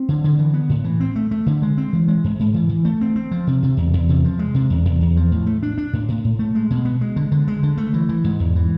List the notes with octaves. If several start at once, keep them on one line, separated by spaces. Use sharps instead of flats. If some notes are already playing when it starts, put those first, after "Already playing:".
Already playing: C4
D3
D3
E3
B3
A2
E3
C4
A3
A3
D3
G#3
C4
E3
G#3
G#2
G#2
E3
E3
A3
C4
C4
F3
C3
C3
E2
E2
C3
F3
G#3
C3
E2
E2
E2
F3
A2
A3
D4
D4
A2
A2
A2
A3
G#3
B2
B3
G#3
D3
D3
G#3
D3
A3
E3
E3
G#2
E2
E3